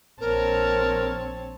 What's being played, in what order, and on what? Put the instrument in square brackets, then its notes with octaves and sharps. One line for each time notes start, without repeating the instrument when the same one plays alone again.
[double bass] A#1 C4 [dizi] A#4 [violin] C#5 A5